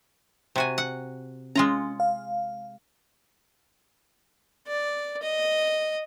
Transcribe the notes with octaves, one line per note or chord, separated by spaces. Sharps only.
C3 F#4 G#5
F#5
G#3 C#4 F4 A#5
F5
D5
D#5